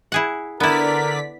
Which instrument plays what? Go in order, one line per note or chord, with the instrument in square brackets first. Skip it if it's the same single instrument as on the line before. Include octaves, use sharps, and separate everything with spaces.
[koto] E4 G#4 F#5
[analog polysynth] D3 D5 B6 [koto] B3 E4 [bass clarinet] A#4